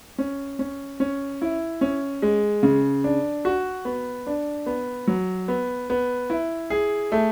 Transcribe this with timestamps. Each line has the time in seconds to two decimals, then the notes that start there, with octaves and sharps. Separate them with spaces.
0.18 C#4
0.59 C#4
1.00 C#4
1.42 E4
1.81 C#4
2.22 G#3
2.63 C#3
3.04 D4
3.45 F#4
3.85 B3
4.27 D4
4.66 B3
5.07 F#3
5.48 B3
5.90 B3
6.30 E4
6.70 G#4
7.12 A3